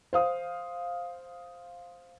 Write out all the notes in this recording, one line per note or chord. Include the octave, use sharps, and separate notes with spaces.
C5 F5 D#6